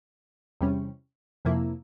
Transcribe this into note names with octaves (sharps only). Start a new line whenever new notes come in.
E2 C3 G3 C#4
F2 C3 F3 A#3 E4